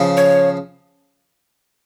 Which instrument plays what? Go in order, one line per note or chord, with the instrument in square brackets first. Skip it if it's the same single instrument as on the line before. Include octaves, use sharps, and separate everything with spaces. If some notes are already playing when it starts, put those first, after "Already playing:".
Already playing: [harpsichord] C#3 F3
[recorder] C#5